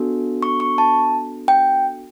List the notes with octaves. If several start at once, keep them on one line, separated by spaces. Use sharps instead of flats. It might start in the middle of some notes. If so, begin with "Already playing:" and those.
Already playing: B3 D4 F#4 A4
C#6
C#6
A5
G5